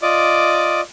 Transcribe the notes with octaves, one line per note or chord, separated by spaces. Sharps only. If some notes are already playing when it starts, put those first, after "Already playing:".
F4 D5 D#5 D6